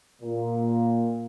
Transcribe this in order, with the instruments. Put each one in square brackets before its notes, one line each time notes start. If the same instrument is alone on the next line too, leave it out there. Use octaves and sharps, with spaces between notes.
[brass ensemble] A#2